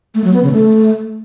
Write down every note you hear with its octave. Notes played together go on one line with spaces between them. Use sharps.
A3
F#3
B3
C#3
A3